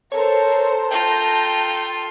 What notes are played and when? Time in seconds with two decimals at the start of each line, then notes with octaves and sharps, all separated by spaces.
0.12 A4 A#4 C5 C#5 A5
0.91 F4 A4 G5 A#5 G6